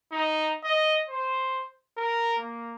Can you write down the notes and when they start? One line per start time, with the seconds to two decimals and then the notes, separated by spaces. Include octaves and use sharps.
0.11 D#4
0.63 D#5
1.09 C5
1.97 A#4
2.39 A#3